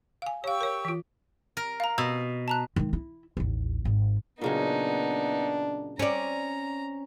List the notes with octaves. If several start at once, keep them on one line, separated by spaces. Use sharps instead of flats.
F5 G#5
G4 C#5 F5 C#6 E6
A#4 C#5
E3 F4
A#4
F5 A#5
B2 E6
A5 A#5 F#6
D#3 G#3
E4
A1 D#2
G#1
A#2 C#3 F#3 B3 D4 D#4
C4 C#4 D5 A#5